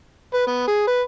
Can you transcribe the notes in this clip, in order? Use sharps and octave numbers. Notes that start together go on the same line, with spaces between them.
B4
B3
G#4
B4